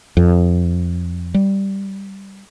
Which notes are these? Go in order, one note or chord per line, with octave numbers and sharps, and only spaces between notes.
F2
G3